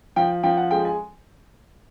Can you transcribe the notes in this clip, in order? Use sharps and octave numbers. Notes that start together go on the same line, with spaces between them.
F3 G5
F3 G5
F#5
G#3 G5
G#5